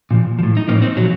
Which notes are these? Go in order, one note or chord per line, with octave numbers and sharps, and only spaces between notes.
A#2 F3
F3
A2
D#4
A2 F3 A#3 C#4
C4 D#4
A#2 F3 F#3